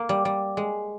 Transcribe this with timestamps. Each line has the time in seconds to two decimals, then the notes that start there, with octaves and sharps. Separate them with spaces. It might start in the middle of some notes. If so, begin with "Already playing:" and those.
Already playing: A#3
0.09 G3
0.25 G3
0.57 G#3